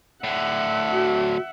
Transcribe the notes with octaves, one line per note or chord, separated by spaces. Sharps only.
A2 D3 E5 F#5
F#4